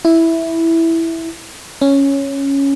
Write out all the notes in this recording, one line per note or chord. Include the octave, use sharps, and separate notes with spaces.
E4
C#4